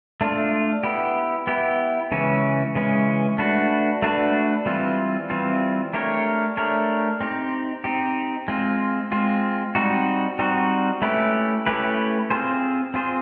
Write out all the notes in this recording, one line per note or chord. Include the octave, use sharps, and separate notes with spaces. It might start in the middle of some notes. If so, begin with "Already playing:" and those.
A3 D4 F4
B3 E4 G4
B3 E4 G4
C#3 E3 G#3 C#4
C#3 E3 G#3 C#4
A3 D4 F#4 B4
A3 D4 F#4 B4
E3 G3 C4 F4
E3 G3 C4 F4
A3 D4 G4 A#4 C#5
A3 D4 G4 A#4 C#5
C4 D#4 G4
C4 D#4 G4
G#3 C4 F4
G#3 C4 F4
G3 C4 D#4 F#4
G3 C4 D#4 F#4
A3 C#4 E4 G4 B4
A3 C#4 E4 G4 B4
C4 F4 G#4 C5
C4 F4 G#4 C5